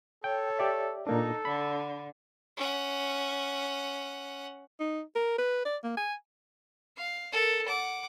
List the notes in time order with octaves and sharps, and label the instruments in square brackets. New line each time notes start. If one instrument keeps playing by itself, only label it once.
[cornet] A4 [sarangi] C#5 [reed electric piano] G5
[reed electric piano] G4 D5 E5
[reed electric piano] A#2 A#3 D4 [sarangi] D#4 [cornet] A4
[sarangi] D3 [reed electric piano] B5
[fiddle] C#4 F#5
[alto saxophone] D#4
A#4
B4
D5
A#3
G#5
[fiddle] F5
A4 A#4
F#5 D6